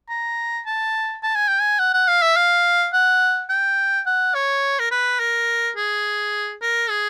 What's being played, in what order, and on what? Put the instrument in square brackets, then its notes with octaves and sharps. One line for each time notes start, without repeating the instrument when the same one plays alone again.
[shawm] A#5
A5
A5
G#5
G5
G#5
F#5
F#5
F5
E5
F5
F#5
G5
F#5
C#5
A#4
B4
A#4
G#4
A#4
G#4